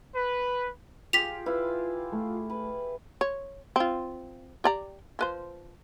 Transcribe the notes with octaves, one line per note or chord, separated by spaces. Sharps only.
B4
F4 G4 G#4 B6 F7
E4 B4 F5
A3
B4
C#5
C4 F4
G4 D5 A#5
F3 B4 C5